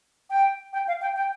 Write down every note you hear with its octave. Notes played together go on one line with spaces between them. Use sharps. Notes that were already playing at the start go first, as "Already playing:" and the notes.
G5
G5
F5
G5
G5